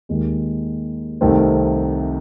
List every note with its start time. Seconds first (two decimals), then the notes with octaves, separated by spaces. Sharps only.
0.09 D#2 D#3 G#3
1.21 C2 C3 D#3 A3 C4